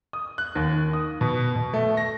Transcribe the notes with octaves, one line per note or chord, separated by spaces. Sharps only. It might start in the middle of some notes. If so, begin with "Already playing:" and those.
D#6
F#6
D#2
D#3
D#6
B2
B2
A3
A#6